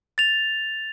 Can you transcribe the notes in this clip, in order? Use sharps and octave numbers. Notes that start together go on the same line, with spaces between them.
A6 F7